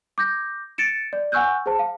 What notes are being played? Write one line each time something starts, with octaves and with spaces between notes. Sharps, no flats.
D6 G6 A#6
A6 C#7 D7 E7
D5
F#5 G#5 C#6 E6 F#6 G6
G#4 C5 A5
F5